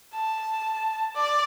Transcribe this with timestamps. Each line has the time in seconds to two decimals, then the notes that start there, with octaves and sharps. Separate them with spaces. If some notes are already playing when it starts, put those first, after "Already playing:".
0.14 A5
1.15 D5